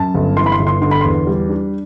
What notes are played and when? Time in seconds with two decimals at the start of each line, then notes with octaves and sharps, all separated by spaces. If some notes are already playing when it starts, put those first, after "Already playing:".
Already playing: F#2 A5
0.14 G1
0.36 E3 C6
0.46 B5
0.52 C6
0.59 G1
0.67 C6
0.82 D3 C6
0.91 B5
1.01 E2 C6
1.27 G3
1.49 D4